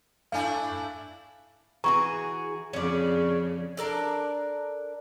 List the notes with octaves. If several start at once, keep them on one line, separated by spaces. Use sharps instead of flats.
A3 D4 E4 F5 G#5
E3 F#4 G#4 A#5 C#6
F2 C#3 C#4 D5
D4 A4 A#4 D5